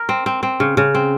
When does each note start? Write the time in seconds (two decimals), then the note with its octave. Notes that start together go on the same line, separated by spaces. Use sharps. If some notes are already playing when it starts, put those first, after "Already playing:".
Already playing: A#4
0.09 C4
0.26 C4
0.43 C4
0.60 C#3
0.77 C#3
0.95 C4